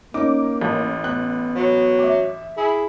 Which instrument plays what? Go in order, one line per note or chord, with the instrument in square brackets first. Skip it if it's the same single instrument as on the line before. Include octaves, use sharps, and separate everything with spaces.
[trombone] A#3 [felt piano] C#4 D#4 [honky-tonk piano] D6
[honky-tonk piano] A1
[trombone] B3 [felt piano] F#6
[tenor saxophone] F#3
[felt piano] E5 D6
[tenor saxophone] E4 [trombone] G#4